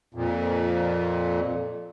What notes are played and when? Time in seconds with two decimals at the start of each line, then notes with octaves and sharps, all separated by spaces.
0.14 F2 A#2